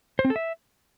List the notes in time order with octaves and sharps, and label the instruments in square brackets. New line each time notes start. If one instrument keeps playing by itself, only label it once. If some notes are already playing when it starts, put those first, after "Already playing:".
[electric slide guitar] C5
C4
A4
E5